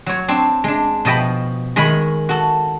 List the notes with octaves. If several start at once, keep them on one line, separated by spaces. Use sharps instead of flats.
F#3 C#5
C4 D4
G#3 D4
B2 F3 D#5 G5 B5
D#3 G#3 A#4 C#5 B5
F#4 A4